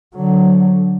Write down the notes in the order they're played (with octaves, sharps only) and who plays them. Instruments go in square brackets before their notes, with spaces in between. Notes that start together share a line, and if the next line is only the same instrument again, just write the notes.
[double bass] D3 F#3